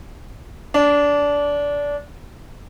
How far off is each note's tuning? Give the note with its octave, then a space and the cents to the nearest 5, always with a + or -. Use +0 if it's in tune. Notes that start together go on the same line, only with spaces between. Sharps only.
D4 -20